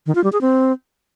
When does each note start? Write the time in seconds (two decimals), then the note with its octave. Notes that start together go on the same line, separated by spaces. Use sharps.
0.06 D#3
0.15 F4
0.24 G3
0.32 G#4
0.41 C4